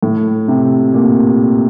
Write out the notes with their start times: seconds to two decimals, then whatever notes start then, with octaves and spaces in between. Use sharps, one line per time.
0.03 A2
0.48 C3
0.94 A#2